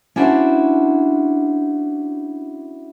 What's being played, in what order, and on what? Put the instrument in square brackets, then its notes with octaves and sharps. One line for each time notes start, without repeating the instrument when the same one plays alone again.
[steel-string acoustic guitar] C#4 D4 E4 F#4 C5